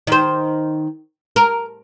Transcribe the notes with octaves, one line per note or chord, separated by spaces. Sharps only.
D#3 C5
A#4